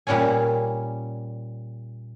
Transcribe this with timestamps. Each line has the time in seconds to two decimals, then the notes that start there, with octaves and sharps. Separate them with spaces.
0.07 A#2 G3 C#4 C#5 G#5